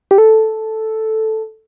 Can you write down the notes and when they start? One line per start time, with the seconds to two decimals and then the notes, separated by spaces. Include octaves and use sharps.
0.11 G4
0.18 A4